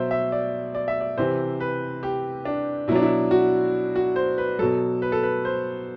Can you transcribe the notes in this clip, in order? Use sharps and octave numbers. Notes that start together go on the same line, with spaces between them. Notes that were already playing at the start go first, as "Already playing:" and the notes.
Already playing: B2 F#3 C5 E5
E5
D5
D5
E5
D5
C3 E3 C5
B4
G4
D4
B2 F#3 D4 E4
E4
F#4
F#4
C5
B4
B2 F#3 A4
B4
A4
B4
C5